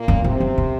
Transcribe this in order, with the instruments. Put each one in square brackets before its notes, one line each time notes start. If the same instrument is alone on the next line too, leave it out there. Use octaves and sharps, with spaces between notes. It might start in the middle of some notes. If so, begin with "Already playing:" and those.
Already playing: [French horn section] A#2 A#3
[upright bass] F#2
[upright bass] G#2 [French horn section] C3 C4
[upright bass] F#2
A#2